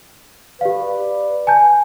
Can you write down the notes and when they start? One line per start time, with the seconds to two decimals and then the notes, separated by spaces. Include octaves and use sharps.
0.61 G4 B4 D5 F5
1.47 G#5 A5 G6